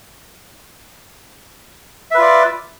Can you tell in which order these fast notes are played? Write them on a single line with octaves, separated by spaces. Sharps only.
E5 B4 F4 D5